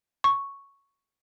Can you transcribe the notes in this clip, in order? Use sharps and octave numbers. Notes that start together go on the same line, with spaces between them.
C#6